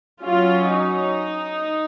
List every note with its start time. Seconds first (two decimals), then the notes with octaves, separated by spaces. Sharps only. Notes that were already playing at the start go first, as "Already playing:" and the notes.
0.21 F#3 C#4 F4
0.71 D#4